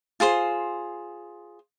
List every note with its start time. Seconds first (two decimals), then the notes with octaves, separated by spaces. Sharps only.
0.20 F4 G#4 C5 C6